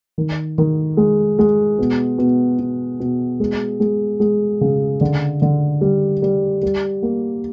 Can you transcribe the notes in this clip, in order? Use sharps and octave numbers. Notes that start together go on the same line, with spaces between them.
D#3
D#3
G#3
G#3
B2
B2
B2
B2
G#3
G#3
G#3
C#3
D3
D3
G3
G3
G3
A#3